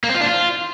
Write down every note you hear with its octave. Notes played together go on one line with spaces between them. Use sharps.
A#3
C4
F4
D4
F4